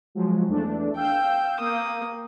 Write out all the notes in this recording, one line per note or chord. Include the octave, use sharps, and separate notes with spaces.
F3 F#3 G#3
E2 A3 D4
F5 G5 E6 G6
A#3 D#6